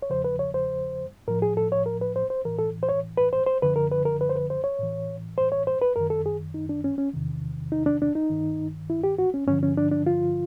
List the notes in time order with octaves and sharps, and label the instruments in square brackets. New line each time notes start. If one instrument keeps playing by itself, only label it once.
[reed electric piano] C#5
E2 C#3 F3 C5
B4
C#5
C5
A2 F3 A#4
G#4
A4
C#5
A#4
B4
C5
C5
A2 E3 A#4
A4
C5
C#5
B4
C5
C5
F#2 D3 F3 B4
A#4
B4
A#4
B4
C5
B4
C5
C#5
A2 E3
C5
C#5
C5
B4
F#2 D#3 A#4
A4
G#4
D#4
D4
C#4
C#4
E2 C3 D#3
D#4
D4
D4
D#4
G2 D#3
E4
G4
F#4
C#4
G2 D3 F3 C#4
C#4
D4
D4
F4